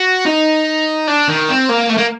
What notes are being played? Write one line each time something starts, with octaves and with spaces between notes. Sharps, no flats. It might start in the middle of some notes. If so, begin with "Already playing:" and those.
Already playing: F#4
D#4
D4
D#3
C4
A#3
A3
A#3